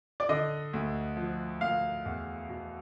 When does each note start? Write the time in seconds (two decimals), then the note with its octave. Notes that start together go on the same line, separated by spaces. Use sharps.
0.20 D5
0.29 D3 D#5
0.73 D2
1.17 F3
1.61 D2 F5
2.05 E2
2.49 B2